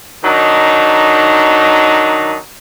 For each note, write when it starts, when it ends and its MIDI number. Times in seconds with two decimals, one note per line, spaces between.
0.24 2.36 51
0.24 2.36 54
0.24 2.36 62
0.24 2.36 63